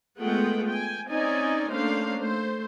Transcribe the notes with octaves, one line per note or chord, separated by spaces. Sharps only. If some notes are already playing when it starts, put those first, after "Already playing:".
G#3 A3 B3 F4 F#5 G5
G5 G#5
C4 C#4 D#4 D5 D#5 G#5
A3 A#3 C#4 D4 C5 F5
A3 C5